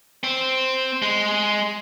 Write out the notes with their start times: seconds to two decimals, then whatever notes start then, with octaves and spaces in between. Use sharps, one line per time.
0.23 C4
1.02 G#3